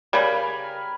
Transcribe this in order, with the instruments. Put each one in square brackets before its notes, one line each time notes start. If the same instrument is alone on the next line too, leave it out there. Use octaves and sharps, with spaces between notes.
[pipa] C#3 G3 [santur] A#4 G#5 B5